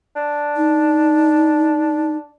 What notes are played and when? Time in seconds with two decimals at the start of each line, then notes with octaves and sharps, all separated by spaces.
0.16 D4
0.56 D#4